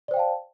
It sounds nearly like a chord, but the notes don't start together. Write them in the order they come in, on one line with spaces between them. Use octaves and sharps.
D5 C5 G5 F5 A5